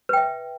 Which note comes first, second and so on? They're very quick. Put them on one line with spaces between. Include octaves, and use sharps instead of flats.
B4 G5 E5